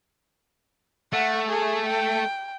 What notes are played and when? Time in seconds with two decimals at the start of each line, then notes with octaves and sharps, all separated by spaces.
1.13 A3 F#5
1.49 G#4
1.86 G5